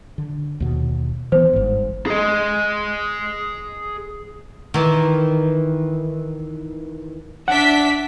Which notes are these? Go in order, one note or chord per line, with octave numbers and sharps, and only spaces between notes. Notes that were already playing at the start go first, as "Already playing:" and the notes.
D3
D#2 B2
E3 B3 C5
G1 G#2
G#4 D#5
D#3 E3
D4 E5 F#5 B6